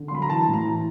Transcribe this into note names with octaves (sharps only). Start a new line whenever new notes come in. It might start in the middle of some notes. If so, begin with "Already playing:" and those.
Already playing: D3
C6
F#3 B5
A#5
E3 A5
A2
A#5
E3